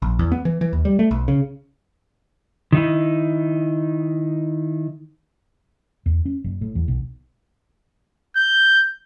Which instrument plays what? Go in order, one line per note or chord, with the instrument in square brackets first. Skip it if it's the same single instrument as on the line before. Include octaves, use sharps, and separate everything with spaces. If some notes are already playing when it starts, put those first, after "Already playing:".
[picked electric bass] A#1
E2
B3
E3
E3
D#2
G3
A3
B1
C#3
[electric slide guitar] D#3 D#4 E4
[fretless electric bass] E2
C#4
F#1
A2
E2
B1
[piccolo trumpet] G6